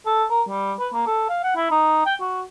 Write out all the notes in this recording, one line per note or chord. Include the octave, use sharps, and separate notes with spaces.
A4
A#4
G3
B4
A#3
A4
F5
F#5
E4
D#4
G5
F#4